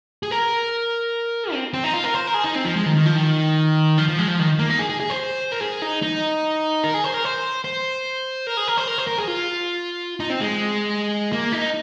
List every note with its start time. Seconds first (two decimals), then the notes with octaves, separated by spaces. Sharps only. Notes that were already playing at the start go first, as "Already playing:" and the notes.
0.23 G#4
0.31 A#4
1.53 C4
1.74 C4
1.84 D#4
1.94 F4
2.04 A#4
2.14 C5
2.27 A#4
2.34 G#4
2.44 D#4
2.55 C4
2.65 F3
2.76 G#3
2.86 D#3
2.96 D#3
3.06 F3
3.16 D#3
3.98 F3
4.09 F3
4.19 G#3
4.28 F3
4.39 D#3
4.59 A#3
4.69 D#4
4.79 G#4
4.90 G#4
5.00 G#4
5.10 C5
5.52 A#4
5.60 G#4
5.82 D#4
6.02 D#4
6.84 A#4
6.94 G#4
7.04 C5
7.14 A#4
7.25 C5
7.64 C5
8.47 A#4
8.57 G#4
8.68 A#4
8.77 C5
8.88 A#4
8.98 C5
9.07 A#4
9.18 G#4
9.28 F4
10.20 D#4
10.30 C4
10.41 G#3
11.33 A#3
11.52 D#4